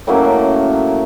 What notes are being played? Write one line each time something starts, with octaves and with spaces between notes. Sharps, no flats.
A2 F#3 A#3 C#4